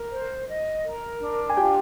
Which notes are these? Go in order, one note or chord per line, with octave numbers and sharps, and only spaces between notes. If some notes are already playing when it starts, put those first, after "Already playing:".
Already playing: A#4
C5
D#5
A#4
D4
G#5
F4 G4 G5